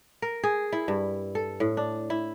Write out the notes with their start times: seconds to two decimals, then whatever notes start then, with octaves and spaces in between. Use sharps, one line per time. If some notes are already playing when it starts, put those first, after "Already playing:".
0.22 A#4
0.43 G#4
0.72 E4
0.88 G2
1.35 A4
1.60 A2
1.77 D4
2.10 E4